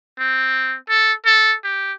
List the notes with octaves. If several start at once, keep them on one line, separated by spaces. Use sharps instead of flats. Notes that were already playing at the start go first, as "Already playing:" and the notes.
C4
A4
A4
G4